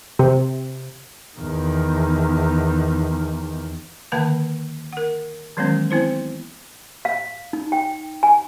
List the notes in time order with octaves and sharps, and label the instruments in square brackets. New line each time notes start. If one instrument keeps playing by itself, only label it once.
[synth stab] C3
[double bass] E2 D#3
[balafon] D3 D#3 A#3 B4 F5 A5
A#4 F#5
D#3 E3 F#3 G#3 B3 C#4
B3 C4 E4 C5
[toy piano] F5
D#4
G5
G#5